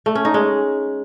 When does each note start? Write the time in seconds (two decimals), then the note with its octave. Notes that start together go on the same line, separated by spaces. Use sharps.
0.06 A3
0.15 C#4
0.25 D#4
0.34 G#3